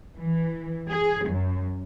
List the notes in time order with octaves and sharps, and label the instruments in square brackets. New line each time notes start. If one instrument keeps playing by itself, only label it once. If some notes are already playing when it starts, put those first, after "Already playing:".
[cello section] E3
G#4
F#2